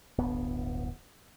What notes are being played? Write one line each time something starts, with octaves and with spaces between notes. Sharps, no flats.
D1 G1 B3